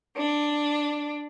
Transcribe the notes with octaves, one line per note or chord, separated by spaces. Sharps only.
D4